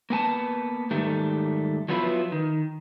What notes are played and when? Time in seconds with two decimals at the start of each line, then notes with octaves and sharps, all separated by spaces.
0.10 A#3 B3 G#5 A5
0.91 G#2 D#3 G3 A3
1.89 F3 F#3 B3 E4 F4 B4
2.32 D#3